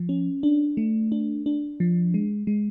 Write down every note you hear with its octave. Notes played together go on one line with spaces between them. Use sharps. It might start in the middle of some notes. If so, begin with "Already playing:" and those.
Already playing: F3
C#4
D4
A3
D4
D4
F3
G#3
G#3